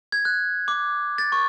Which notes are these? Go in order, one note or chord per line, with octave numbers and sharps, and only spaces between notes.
G#6
F#6
D6
A6
C#6